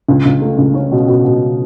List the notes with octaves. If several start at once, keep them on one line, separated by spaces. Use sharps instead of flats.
C#2
C#2
A3
C#2
C#4
B2
B2
B2